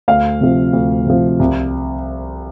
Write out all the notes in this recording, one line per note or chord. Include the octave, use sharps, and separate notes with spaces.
D2 F5
C3 F3
D2
C3 F3
C2